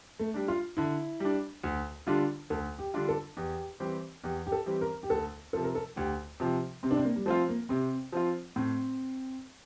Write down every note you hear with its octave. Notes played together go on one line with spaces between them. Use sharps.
A3
G3 D4
F4
D3 E4
G3 D4
D2
D3 G3 D4 F4
D2 A4
G4
D3 G3 D4 F4
A4
E2 G4
E3 G3 C4 G4
E2 G4
G4
A4
E3 G3 C4 G4
A#4
G4
D2 A4
C3 F3 A4
A#4
A4
D2 G4
C3 F3 G4
C3 C4
D4
C4
A#3
G3
F3 A3 C4 F4
A#3
C3 C4
F3 C4 F4
A2 C4